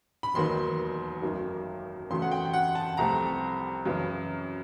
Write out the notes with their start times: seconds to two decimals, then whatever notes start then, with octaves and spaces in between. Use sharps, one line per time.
0.23 B5
0.34 E1 D#2 D#3 F#3 B3 C6
1.22 G#1 F#2 D#3 F#3 A3
2.11 E2 C#3 F#3 A3 C6
2.22 F#5
2.31 G5
2.45 G5
2.54 F#5
2.75 A5
2.97 C2 C3 F3 A3 C4 A#5
3.85 F#2 C#3 E3